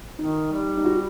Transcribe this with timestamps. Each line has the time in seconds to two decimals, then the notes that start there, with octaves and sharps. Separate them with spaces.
0.18 D#3 D#4
0.52 G3
0.77 D#4
0.85 F#4